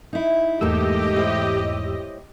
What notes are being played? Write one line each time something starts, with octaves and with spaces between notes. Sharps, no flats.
D#4 E4
E2 G#2 A3 A#3 D#4 G4 D#5 E6
E4 C5 C#5